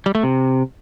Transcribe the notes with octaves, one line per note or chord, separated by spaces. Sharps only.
G3
A3
C3